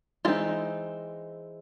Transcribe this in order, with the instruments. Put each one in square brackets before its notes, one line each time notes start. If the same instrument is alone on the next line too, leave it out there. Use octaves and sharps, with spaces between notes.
[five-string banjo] E3 G#3 C4 D#4 F4